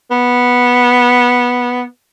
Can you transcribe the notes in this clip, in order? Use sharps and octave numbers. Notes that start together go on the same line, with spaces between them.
B3